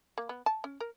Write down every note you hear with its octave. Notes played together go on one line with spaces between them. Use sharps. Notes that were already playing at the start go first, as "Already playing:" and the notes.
A#3
B3
A5
C#4
A#4